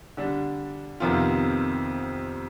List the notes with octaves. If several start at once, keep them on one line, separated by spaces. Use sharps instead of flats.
D3 G3 D4
F2 C3 D#3 B3 F4